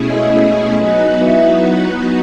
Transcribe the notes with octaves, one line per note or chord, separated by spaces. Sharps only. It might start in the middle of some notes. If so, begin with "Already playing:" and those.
Already playing: B2 A3 C#4 E4 G#4
G#3
F#3 G#3 B3 D#4 F#4 B4
E3